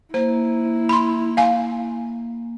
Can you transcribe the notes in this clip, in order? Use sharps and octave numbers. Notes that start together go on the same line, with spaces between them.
A#3 E4 C5
B5 C6
F5 G#5